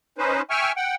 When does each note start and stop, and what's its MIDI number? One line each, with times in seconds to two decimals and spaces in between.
0.18 0.41 61
0.18 0.41 63
0.18 0.41 71
0.18 0.41 72
0.50 0.72 76
0.50 0.72 79
0.50 0.72 80
0.50 0.72 85
0.50 0.72 89
0.77 0.95 78
0.77 0.95 79